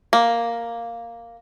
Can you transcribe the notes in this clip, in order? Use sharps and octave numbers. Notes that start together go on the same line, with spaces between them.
A#3